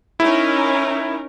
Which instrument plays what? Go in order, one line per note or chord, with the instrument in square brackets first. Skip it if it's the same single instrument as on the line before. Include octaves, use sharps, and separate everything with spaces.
[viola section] C#4 D#4 A#4 [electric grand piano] E4